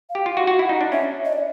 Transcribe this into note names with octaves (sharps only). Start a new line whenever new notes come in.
F5
G4
F4
F#4
F#4
E4
D#4
D4
C#4 E5
D#5
D5